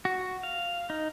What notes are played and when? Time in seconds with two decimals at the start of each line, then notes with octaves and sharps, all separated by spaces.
0.05 F#4
0.43 F5
0.90 D#4